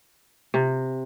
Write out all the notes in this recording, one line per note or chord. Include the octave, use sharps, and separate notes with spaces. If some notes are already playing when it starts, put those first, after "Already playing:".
C3